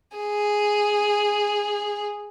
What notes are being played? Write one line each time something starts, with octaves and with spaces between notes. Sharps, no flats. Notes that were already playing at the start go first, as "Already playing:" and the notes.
G#4